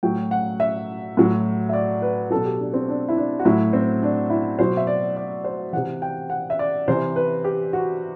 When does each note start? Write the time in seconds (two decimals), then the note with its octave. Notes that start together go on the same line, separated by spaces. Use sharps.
0.03 A2 F#3 G5
0.31 F#5
0.60 E5
1.17 A2 F#3
1.69 E5
1.73 D5
2.02 B4
2.30 B2 F#3 A4
2.45 G4
2.60 D4
2.74 C4
2.88 D4
3.09 E4
3.17 D4
3.39 F#4
3.45 A2 F#3 E4
3.73 C4
4.03 D4
4.30 E4
4.59 B2 F#3 C5
4.77 E5
4.87 D5
5.16 D5
5.44 C5
5.73 C3 E3 F#5
6.02 G5
6.30 F#5
6.50 E5
6.59 D5
6.88 C3 E3 C5
7.16 B4
7.44 G4
7.73 F#4